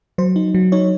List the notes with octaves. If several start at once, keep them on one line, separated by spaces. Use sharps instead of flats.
F#3 C5
D#4
F#3
D#4 C#5